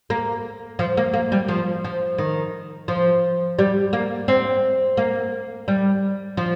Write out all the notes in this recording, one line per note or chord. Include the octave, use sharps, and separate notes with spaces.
A#3
F3
A#3
A#3
G3
F3
F3
D#3
F3
G3
A#3
C4
A#3
G3
F3